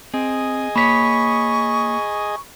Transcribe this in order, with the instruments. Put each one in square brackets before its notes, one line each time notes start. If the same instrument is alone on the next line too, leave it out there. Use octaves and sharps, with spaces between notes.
[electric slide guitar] C4 [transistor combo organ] G#4 D#5 G#5
[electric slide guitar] A#3 C#5 [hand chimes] B5 B6 [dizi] C#6